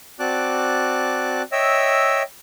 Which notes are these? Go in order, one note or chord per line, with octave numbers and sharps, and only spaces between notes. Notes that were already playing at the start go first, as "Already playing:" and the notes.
C4 F#4 D5 A5 D6 F#6
C#5 D#5 E5 G5 E6